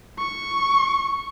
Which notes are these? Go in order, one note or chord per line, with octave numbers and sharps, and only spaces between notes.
C#6